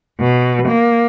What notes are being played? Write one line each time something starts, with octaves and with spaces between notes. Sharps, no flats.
B2
A#3